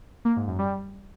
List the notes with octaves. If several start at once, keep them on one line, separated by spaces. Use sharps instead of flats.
A#3
G#2
F#2
G3